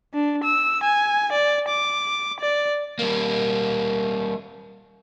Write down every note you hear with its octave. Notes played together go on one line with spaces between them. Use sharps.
D4
E6
G#5
D5
D6
D5
G3 A#3